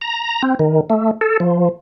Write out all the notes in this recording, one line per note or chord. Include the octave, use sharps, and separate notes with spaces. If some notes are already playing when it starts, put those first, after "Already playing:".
A#5
C4
D#3
A3
A4
F3